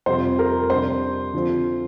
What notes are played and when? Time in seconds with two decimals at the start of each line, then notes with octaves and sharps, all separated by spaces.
0.06 F2 C3 G3 C4 F4 C5
0.39 A#4
0.70 C3 G3 D4 C5
1.33 D3 F3 C4 F4